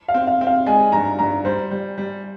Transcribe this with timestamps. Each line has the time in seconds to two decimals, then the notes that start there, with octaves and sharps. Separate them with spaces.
0.08 F5
0.14 C4
0.27 F5
0.41 C4
0.47 F5
0.66 G#3 G#5
0.92 G2 A#5
1.19 G2 A#5
1.45 G3 C5
1.71 G3
1.98 G3